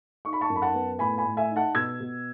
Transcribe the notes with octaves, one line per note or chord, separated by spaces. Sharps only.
D#4 C#6
B5
A5 C#6
F#2
B5
F#5 A5
B3
A2 G#5 B5
G#5 B5
A2
E5 G#5
D#4
F#5 A5
B2 E6 G#6
B2